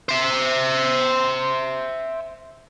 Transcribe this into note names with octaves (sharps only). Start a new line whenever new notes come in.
C5 E5